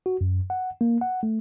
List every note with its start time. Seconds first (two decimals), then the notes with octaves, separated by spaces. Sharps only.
0.06 F#4
0.21 F#2
0.50 F#5
0.81 A#3
1.01 F#5
1.23 A3